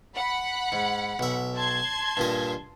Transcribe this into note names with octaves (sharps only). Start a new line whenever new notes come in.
F#5 B5
G#2
B1 E5
A5 C6 G#6
G2 A#2 D#5